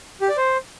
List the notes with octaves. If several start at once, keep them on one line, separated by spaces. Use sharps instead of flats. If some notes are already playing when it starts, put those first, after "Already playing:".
G4
D5
C5